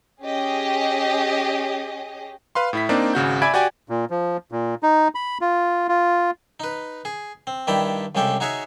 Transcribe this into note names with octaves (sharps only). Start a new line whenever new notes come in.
C#4 G4 G#4 D#5
B4 F5 C6
A2 E4 B6
A#3 C4 D4 D#4 D5
G#1 C#3 F#4 G6
D5 E5 G#5 B5 G#6 D7
F#4 G4 D5 G5 G#5
A#2
F3
A#2
D#4
B5
F4
F4
D#4 B4
G#4
C4
G2 D#3 E4 D5 G5 B5
C2 C#3 G#3 G4 A4 G5
D#4 F#4 G#4 C#5 E5